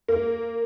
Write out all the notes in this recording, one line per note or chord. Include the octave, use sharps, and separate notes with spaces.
A#3